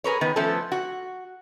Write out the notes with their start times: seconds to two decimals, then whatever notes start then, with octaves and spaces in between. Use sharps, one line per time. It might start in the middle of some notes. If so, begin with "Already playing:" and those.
0.04 G#4 A#4 B4 C#5
0.21 D#3 B3 B4
0.36 F3 A3 B3 C#4 A4
0.72 F#4